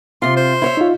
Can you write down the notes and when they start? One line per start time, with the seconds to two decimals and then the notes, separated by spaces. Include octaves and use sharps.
0.22 C3 F4 C6
0.37 C5
0.62 E4 C#5 E5
0.77 D#4 F4